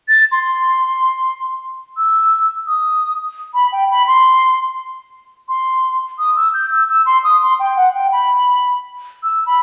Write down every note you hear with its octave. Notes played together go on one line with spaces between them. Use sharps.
A6
C6
E6
D#6
B5
G5
B5
C6
C6
D#6
E6
G6
E6
E6
C6
D#6
C6
G5
F#5
G5
B5
E6
B5